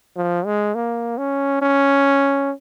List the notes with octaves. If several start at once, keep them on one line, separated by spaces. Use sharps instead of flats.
F3
G#3
A#3
C#4
C#4